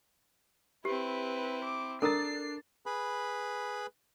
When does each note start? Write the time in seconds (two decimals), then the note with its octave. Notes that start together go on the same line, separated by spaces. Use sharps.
0.85 C4 E4 G4 B4
1.65 D6
2.02 D4 A4 A#4 A#5 A6 C7
2.86 G#4 B4 B5